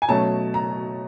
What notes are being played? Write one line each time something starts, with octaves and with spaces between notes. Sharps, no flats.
G#5
B2 F#3 A3 C#4 A5
A#5